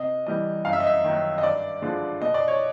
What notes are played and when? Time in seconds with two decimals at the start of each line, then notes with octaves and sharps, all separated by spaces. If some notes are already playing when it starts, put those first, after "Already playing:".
Already playing: C3 D#5
0.27 E3 G3 D#5
0.65 F#2 F5
0.73 E5
0.80 D#5
0.87 E5
1.04 D#3 F#3
1.38 D#5
1.43 G2 D5
1.82 D3 F3 G#3
2.21 B2 D#5
2.34 D5
2.48 C#5